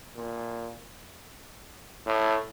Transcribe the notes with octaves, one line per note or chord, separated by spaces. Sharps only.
A#2
A2